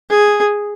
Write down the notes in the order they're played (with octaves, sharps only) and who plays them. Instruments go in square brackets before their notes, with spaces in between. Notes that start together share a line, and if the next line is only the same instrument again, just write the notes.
[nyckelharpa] G#4